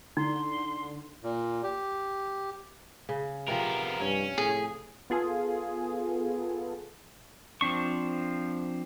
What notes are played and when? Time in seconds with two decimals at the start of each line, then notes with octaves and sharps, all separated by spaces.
0.17 D3 D#4 E4 C6
1.23 A#2
1.64 G4
3.09 C#3
3.48 C3 F3 B3 A#4
4.00 G2 C#4
4.38 A2 G#4
5.10 B3 F4 G#4 A4
7.61 F3 C4 D4 C#6